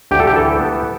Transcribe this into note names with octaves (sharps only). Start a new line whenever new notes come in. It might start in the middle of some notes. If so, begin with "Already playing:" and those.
D2 G4
A4
G4
E3 A4
B3